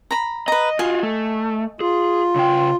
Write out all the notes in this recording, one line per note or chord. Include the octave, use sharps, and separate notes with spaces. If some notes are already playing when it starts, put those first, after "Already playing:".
A#5 B5
B4 D#5 A#5
F4 F#4 D#5 G#5
A3
F4 G#4
C#3 G5